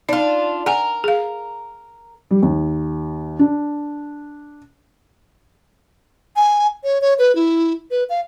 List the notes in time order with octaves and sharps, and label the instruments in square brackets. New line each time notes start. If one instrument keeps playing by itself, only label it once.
[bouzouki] D4 F4 [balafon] D#4
[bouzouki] A#4 [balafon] F#5 G#5
[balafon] G#4 F5
[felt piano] G3
D#2
D4
[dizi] G#5
C#5
C#5
B4
E4
B4
F5